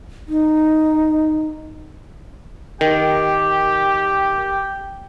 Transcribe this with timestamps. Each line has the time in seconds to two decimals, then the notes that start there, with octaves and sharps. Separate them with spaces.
0.28 D#4
2.81 D#3 G4 G5